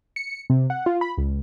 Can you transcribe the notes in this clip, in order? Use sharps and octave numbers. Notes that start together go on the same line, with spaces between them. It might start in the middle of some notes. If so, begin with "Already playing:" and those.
C#7
C3
F#5
F4
B5
C#2